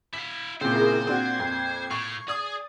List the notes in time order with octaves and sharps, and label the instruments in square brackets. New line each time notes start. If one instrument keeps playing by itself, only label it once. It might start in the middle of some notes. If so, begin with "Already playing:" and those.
[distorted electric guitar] E4 F5 [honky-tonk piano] B6
[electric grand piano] A#2 C#3 [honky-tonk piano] C4 [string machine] E4 G#4 A#4 [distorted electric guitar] C5
[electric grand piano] A#2 F#6 [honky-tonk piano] C4 D4 F#4 [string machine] G#6 C7
[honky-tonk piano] F2
[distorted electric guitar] A2 [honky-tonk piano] C#6
[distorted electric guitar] G#4 [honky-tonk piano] D5 D#6